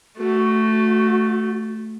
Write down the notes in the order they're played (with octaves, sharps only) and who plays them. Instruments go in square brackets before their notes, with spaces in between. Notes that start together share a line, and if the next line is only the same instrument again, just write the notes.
[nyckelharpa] A3 [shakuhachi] F#4